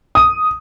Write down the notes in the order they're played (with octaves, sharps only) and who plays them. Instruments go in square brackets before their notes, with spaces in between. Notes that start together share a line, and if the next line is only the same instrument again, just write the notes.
[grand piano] D#6